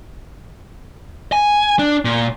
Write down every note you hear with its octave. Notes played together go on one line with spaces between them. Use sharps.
G#5
D4
A#2